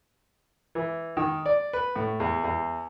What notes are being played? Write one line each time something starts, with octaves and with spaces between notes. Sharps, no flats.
E3
D#3
D5
B4
A2
E2
E2